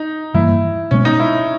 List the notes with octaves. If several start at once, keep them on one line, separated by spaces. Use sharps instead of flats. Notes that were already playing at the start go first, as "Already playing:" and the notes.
Already playing: D#4
G2 E3 G3 A#3 E4
B2 G#3 B3 C#4
D#4
E4